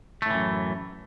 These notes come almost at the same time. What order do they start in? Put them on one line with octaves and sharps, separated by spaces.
A3 A2 E3 F#2